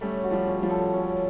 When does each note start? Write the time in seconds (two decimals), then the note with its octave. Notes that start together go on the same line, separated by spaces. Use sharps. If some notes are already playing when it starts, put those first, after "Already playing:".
0.01 G3 A3 C#4
0.23 F#4
0.31 F3 G3
0.47 C#4
0.62 F3 G3
0.70 A4
0.93 C#4